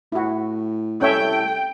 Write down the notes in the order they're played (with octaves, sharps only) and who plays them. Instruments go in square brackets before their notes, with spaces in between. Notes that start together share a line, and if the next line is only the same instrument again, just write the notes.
[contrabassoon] A2 [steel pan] E4 F#4
[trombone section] C2 E4 A4 [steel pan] C#4 C#5 E5 [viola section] G5